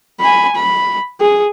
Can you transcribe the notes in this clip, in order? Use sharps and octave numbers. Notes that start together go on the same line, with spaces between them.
G#5 B5
B5
G#4